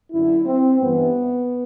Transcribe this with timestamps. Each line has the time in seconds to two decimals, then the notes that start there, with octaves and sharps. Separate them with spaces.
0.12 F#2 D3 E4
0.46 C4
0.81 G2 E3 B3